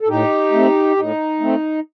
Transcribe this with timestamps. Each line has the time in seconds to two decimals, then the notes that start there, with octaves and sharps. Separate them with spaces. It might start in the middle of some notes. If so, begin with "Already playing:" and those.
0.01 A4
0.08 A2 D#4 G4
0.52 A3 C4
0.96 A2 D#4
1.40 A3 C4